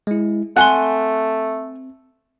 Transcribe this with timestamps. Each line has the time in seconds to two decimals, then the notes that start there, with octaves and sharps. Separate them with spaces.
0.07 G#3 E4
0.57 A3 C4 F#5 G#5 C6 F#6